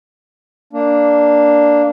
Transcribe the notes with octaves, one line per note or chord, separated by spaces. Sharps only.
A#3 D4